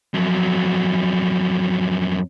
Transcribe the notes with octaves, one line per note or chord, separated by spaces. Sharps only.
F2 F#3